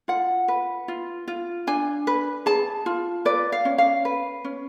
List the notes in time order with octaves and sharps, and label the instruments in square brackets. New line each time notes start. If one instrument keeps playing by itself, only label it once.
[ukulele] F4 F#5
B4
F4
F4
D4 G#5
B4
G#4 A5
F4
B4 D5
F5
C#4
F5
B4
C#4